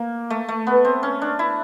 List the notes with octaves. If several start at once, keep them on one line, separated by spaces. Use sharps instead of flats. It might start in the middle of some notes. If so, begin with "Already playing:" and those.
Already playing: A#3
A3
A3
B3
C4
C#4
D4
E4